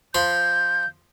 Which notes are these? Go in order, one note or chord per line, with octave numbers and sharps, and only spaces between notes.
F3 B5 C6 G6